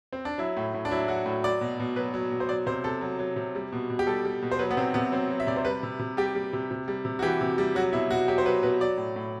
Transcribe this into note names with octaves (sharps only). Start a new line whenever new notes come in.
C4
D4
F#3 E4
A2
A2
D4
F#3 E4
F#3 F#4
A2
F#3 D5
B2
B2
F#3 B4
F#3
B2
C5
F#3 D5
C3 C5
C3 A4
F#3
F#3
C3
G3
B2
B2
G4
G3 A4
G3
B2
C5
F#3 B4
B3
C3 C4
C3 B3
F#3 C4
F#3
E5
C3 D5
C5
G3 B4
C3
C3
G3 G4
G3
C3
C3
G3
C3
F#4
E3 G4
C3
G3
F#3 F#4
B2 E4
B2 F#4
F#3 G4
C5
F#3 B4
B2 B4
F#3 D5
A2
A2